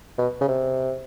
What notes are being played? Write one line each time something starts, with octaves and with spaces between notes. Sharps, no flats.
B2
C#3
C3